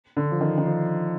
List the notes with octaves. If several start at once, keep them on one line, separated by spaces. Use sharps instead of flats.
D3
F3
D#3
D#3
F3